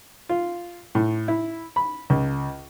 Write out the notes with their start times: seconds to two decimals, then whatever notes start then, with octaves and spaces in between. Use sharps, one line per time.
0.29 F4
0.95 A2
1.28 E4
1.76 B5
2.10 C#2